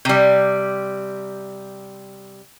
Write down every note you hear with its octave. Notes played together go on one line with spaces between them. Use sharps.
C3 G3